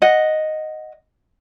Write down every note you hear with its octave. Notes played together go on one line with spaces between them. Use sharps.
D#5 F#5